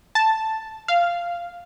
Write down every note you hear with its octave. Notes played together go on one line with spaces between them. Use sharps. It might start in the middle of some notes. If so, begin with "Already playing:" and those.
A5
F5